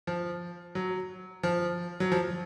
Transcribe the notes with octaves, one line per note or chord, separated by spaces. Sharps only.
F3
F#3
F3
F#3
F3